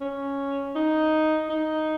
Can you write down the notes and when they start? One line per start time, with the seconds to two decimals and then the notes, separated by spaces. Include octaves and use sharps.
0.01 C#4
0.76 D#4
1.49 D#4